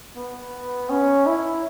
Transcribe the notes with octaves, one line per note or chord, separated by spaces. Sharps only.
B3
C#4
E4